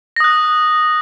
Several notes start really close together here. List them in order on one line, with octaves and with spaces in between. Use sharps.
A#6 D#6 F#6